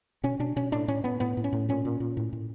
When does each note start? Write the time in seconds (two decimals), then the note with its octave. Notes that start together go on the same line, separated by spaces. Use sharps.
0.24 B2 C#4
0.39 B2 D4
0.56 B2 C#4
0.72 A2 D4
0.88 A2 C#4
1.04 A2 B3
1.20 A2 B3
1.37 A2
1.44 C#4
1.53 A2
1.69 A#2 C#4
1.85 A#2
2.00 A#2
2.17 A2
2.33 A2